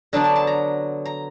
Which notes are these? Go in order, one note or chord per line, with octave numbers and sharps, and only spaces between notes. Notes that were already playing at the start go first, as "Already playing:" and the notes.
D3 F#3 B3 D4 A5
A5
A5
A#5
A#5